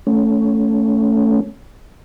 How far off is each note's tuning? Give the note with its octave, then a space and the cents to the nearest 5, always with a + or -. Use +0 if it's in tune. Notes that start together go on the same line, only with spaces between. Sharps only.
A3 +0 C#4 +10